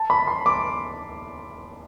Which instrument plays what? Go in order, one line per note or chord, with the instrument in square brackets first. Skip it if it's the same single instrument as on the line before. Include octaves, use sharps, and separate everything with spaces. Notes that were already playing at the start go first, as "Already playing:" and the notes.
Already playing: [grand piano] A5
B5
C6
D6